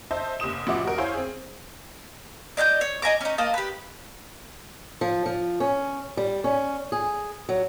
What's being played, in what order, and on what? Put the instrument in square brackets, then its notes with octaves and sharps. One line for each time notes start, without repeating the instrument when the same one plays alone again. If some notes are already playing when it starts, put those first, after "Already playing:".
[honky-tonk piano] C5 D#5 E5 A5
F#1 C3 D#6 E7
A1 F3 F#4 E5 D6
F#4 A#4
E4 C5 C#5 F5 G#5
C4 G#4
[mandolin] D5 D#5 F#6 G6
C#5
D#5 G#5 A#5 D6
C#4 D#4
A#3 D#5 A5
G4 B4
[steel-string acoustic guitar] F3
F3
C#4
G3
C#4
G#4
F#3